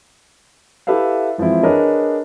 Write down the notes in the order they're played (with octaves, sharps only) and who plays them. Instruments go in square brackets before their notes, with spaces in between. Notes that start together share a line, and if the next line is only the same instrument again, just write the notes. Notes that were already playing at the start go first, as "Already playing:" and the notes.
[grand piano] E4 G4 A4 B4 E5 F5
E3 F3 G#3 C4 E4
D4 G#4 A#4 B4 C#5 D#5